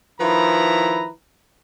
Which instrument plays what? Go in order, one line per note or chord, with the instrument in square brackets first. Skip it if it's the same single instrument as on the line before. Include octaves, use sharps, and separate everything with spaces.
[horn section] D#3 F3 E4 B4 A#5 B5